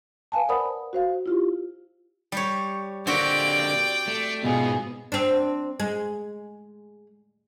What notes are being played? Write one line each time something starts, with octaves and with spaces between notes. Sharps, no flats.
B4 F5 G#5 A5
A#4 C5 D5 F#5 B5 D#6
F#4 C5 F5
E4 F4 G4
G3 G4 C#5
D3 A#3 C4 F#4 G4 D5 G5
A3
G#2 B2 F4 G#4
C4 D4
G#3